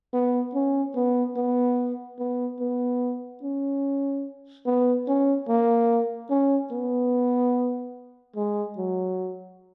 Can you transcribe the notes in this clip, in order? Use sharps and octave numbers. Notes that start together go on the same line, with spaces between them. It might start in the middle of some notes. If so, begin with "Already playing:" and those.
B3
C#4
B3
B3
B3
B3
C#4
B3
C#4
A#3
C#4
B3
G#3
F#3